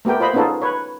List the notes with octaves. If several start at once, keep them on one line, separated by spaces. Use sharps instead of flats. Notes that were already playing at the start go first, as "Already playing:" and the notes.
A3 B3 G4 A#4 G5
F4 C5 D#5 B5
B3 C#4 D#4 F4 G#4 A4
B4 C#5